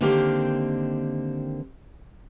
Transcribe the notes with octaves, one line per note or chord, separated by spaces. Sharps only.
D3 D#3 A#3 C4 G4 A#4